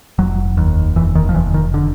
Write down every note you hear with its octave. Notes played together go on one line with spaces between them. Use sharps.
F1 F#3
D#2
F1 E3
D#3
F3
F1 E3
D#3
D3